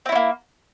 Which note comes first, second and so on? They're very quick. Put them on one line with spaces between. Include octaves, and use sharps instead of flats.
C4 E4 C#4 A#3